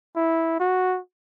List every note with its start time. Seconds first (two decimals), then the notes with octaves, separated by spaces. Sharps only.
0.16 E4
0.60 F#4